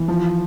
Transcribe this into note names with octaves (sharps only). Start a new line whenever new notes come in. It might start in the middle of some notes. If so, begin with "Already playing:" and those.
Already playing: E3
F3